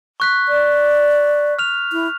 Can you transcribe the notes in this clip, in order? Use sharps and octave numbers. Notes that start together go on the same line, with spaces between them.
C#6 F#6 B6
D5
F6 F7
E4